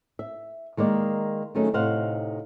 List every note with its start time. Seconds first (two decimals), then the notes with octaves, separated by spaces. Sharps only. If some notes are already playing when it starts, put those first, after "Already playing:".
0.19 E5
0.77 D#3 G#3 A#3 D5
1.55 D#3 F#3 A3 C#4 D#4 G#4
1.74 A2 C3 D#4 C5 F5 F#5